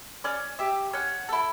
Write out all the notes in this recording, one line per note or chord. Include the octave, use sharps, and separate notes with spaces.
C#4 D5
G4 E5
C#4 F#5
E4 A4